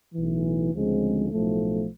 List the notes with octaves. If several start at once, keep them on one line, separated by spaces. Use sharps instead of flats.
B1 A2 E3
D2 C#3 F3 G#3 C4
B1 A2 F3 A3